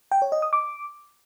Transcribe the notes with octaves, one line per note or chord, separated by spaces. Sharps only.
G5
C#5
D#5
D#6
D6